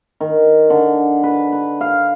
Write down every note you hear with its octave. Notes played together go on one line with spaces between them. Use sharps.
D#3
D3
B4
B4
F5